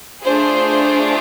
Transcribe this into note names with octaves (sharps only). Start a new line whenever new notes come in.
A3 D4 F4 G#4 C5